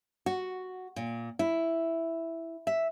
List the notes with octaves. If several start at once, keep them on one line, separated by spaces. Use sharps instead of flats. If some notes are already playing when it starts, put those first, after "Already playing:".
F#4
A#2
E4
E5